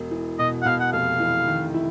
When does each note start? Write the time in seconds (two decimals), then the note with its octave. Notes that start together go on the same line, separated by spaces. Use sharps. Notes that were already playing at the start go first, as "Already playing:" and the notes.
Already playing: E1
0.11 E3
0.39 B2 D#5
0.62 F#5
0.65 B2 F5
0.80 F#5
0.93 F1 F5
1.20 E3
1.47 D#3
1.74 E4